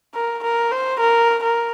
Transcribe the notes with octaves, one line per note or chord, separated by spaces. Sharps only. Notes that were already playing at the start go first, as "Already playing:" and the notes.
A#4
A#4
C5
A#4
A#4